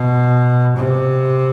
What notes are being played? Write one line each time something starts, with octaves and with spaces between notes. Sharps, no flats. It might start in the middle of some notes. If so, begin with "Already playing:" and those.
Already playing: B2
C3